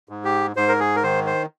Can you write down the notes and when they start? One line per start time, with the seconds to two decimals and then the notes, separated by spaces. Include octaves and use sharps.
0.09 G#2
0.25 G4
0.56 G#2 C5
0.68 A#4
0.80 G#4
0.96 A#4
1.03 D#3 C5
1.26 C5